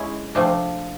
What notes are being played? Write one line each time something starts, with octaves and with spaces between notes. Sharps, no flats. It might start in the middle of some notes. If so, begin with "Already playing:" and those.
Already playing: G#3 C#4 E4
C3 F3 A3 D4